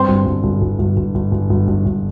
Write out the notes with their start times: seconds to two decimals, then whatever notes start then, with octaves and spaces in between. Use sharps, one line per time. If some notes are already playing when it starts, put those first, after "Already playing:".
Already playing: G2 C4
0.08 G1
0.26 G1
0.44 G1
0.62 G1
0.79 G1
0.97 G1
1.15 G1
1.32 G1
1.50 G1
1.68 G1
1.86 G1